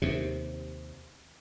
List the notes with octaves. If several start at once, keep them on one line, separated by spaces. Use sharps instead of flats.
D#2 C3